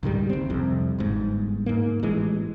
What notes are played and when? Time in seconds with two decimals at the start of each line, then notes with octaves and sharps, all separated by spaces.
0.03 C#2 G#2 D#3 G3
0.30 F#1 C4
0.50 C2 F2
0.98 G1 G#2
1.66 G#2 A#3
2.03 A1 E3 G#3